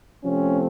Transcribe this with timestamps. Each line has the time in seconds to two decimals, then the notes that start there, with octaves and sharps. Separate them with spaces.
0.23 C3 F3 A3 C4 C#4